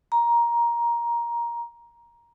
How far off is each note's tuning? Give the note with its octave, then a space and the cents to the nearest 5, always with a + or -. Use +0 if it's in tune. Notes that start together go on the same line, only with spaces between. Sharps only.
A#5 +15